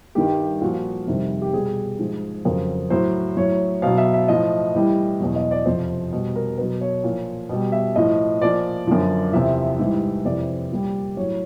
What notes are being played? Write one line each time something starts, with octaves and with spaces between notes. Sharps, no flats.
G2 D#3 G3 G4
A#2 F3 F#4
F2 C3 D#3 G3
G4
B2 G3 G#4
G#2 F3
F2 C#3 F#3 A#4
A2 F#3 C5
A2 F#3 C#5
B2 F#3 F5
E5
E5
A2 F3 D#5
A2 E3 G3
E2 B2 F#3
D#5
D5
F2 C3 F3 C5
B2 G3
A#4
B2 F#3 B4
C#5
A#2 F3
B2 G3
E5
A2 F3 D#5
A#2 F3 D5
F#2 D3 F3
E2 C3 F3 E5
G#2 E3 G3
F2 C3 E3 D5
A#2 G3
A2 F#3 C#5